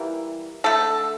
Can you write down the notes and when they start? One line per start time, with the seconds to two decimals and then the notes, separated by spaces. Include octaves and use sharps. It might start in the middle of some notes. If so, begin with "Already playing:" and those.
Already playing: E3 G3 A#3
0.64 D3 A3 A4